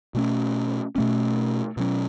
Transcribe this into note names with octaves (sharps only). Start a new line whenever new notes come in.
B2 A3 C#4
B2 A3 C#4
B2 F#3 C#4